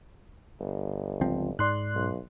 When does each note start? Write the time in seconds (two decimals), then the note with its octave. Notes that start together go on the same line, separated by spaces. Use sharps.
0.60 G1
1.21 C#2 F3 C4
1.59 G#2 D5 C6 F#6
1.95 B1